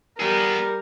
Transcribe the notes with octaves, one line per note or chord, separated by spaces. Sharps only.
G3 B3 G#4 A#4